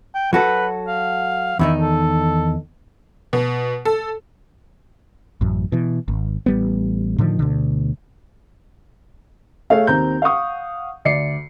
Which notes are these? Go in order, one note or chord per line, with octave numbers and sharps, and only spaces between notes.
G5
F#3 F#4 A4 B4
F5
E2 D#3 D#4 E4
A4
B2
A4
A1 F#2
B2 E3
G#1
A1 G3 B3
A2 D3 D#3 F3
D2 B2 D3
A3 G#4 A4 C#5 F5
D#2 C4 A#5 G6
F5 F#5 C#6 D#6
D2 D5 C7 C#7